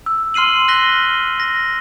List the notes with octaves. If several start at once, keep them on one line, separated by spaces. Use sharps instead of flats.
E6
C6 F6 C7 D#7 F#7
F6 F#6 A#6 B6 G7
A#6